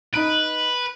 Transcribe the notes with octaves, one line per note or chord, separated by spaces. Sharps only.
D#4 B4 D7